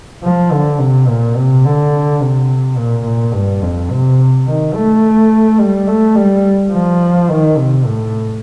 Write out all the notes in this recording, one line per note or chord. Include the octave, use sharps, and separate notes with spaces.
F3
D3
C3
A#2
C3
D3
C3
A#2
A#2
G2
F2
C3
D#3
A3
G3
A3
G3
F3
D#3
C3
A2